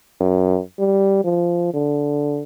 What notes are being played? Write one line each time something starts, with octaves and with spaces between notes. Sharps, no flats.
F#2
G3
F3
D3